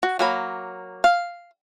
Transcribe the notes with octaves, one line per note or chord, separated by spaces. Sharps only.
F#4
F#3 A#3 B5
F5